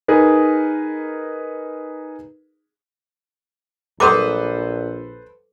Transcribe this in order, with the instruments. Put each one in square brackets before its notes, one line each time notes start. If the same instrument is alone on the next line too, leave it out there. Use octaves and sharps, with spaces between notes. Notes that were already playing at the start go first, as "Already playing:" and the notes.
[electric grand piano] D#4 G#4 A#4 B4
[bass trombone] A#1 [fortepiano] A4 B4 C5 [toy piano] D6 D#6